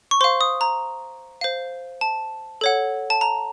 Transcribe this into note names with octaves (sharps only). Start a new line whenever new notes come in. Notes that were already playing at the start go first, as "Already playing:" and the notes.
C#6
C5 F5 C6
D#6
A#5
C5 F5
A5
A4 C#5 F#5
A5
A#5